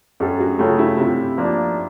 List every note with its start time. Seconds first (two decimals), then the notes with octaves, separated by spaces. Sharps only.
0.20 F#2 G4 A4
0.39 F#4 G#4
0.59 C#3 F#3 A3 F4 G4
0.79 E4 F#4
0.98 C3 F4 G4
1.37 F3 A#3 D4